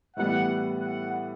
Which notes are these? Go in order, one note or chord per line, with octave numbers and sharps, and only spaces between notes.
A2 E3 G3 B3 F#5
F#5